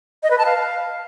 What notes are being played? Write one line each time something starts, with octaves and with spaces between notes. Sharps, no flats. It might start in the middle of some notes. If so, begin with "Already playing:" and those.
D#5
B4
A5
F5